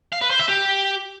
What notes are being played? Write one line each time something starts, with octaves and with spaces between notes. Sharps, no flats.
F5
B4
C5
E5
G4